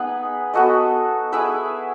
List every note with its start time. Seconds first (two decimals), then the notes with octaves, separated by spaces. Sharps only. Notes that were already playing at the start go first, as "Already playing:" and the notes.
Already playing: B3 D#4 G#4 B4
0.54 B3 F#4 A4 D#5
1.32 E4 G#4 B4 E5